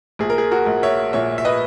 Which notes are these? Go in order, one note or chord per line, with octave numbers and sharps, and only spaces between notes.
A#1 G#4
A#4
G#4
F#4 A#4
A#1
C#5 E5
A#2 C#5 E5
E5
B4 D#5